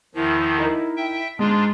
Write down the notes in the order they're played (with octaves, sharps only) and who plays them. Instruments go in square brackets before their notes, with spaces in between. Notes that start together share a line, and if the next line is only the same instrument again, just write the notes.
[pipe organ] E2 D#3 F3 [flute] E4
[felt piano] D#4 A#4
[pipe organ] E5 G5
[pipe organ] G#2 D4 F4 [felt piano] G#3